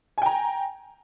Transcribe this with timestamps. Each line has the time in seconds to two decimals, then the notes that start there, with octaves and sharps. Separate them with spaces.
0.18 G#5
0.22 G5
0.26 A#5